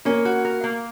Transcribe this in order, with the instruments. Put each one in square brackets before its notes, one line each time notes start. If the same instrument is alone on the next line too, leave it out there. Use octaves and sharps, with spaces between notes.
[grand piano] A#3 [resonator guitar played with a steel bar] C#4
[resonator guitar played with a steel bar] F#4
A#4
A#3